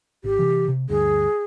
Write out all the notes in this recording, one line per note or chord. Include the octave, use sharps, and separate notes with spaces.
G#1 G4
C3 E3
C3
D2 G2 G#4